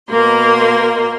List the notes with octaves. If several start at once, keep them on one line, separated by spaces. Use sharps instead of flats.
B2 A#3 A#4 C6